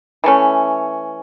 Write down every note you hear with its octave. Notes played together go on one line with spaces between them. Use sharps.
E3 A3 C#4